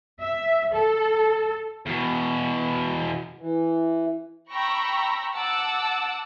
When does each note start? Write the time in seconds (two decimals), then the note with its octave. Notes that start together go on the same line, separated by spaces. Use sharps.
0.21 E5
0.74 A4
1.86 E2 B2
3.40 E3
4.52 G5 A#5 B5 C#6 E6 A#6
5.34 F#5 A5 D6 E6